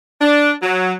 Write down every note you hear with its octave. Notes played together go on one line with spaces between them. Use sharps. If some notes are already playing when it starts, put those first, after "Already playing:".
D4
F#3